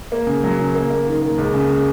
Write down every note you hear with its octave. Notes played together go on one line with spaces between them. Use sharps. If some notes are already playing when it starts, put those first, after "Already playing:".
A#3
C#3
F#3
C#3
A#3
A#3
D#3
A#3
C#2
C#3
C#3